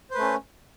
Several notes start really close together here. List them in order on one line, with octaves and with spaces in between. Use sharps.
C5 B4 A3 C#4